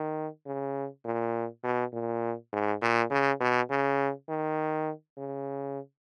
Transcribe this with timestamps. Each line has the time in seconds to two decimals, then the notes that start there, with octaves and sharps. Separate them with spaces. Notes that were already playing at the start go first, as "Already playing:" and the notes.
Already playing: D#3
0.46 C#3
1.05 A#2
1.64 B2
1.93 A#2
2.53 G#2
2.82 A#2
3.11 C#3
3.41 B2
3.71 C#3
4.29 D#3
5.18 C#3